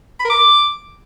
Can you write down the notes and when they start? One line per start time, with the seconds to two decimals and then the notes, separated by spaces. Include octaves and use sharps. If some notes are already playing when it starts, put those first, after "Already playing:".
0.20 B5
0.25 A#4
0.30 D6